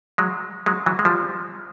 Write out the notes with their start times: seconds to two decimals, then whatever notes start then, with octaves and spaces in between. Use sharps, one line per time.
0.18 F#3 G#3
0.66 F#3 G#3
0.86 E3 F#3
0.99 G#3
1.05 F3 G3